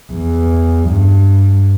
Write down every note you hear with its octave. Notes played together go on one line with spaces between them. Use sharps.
E2
G2